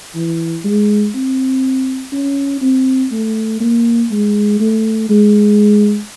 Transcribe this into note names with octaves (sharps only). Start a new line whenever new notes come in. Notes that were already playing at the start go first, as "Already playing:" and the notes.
E3
G#3
C4
C#4
C4
A3
A#3
G#3
A3
G#3